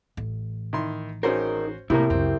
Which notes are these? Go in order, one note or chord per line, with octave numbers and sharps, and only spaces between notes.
A1
D#3 E4 C6
C#4 D#4 F#4 G#4 A#4 C5
A2 C3 A#3 E4 G4 A#4
C#2 F#2 C4